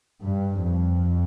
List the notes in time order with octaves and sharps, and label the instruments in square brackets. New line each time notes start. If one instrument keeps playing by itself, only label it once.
[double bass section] G2
F2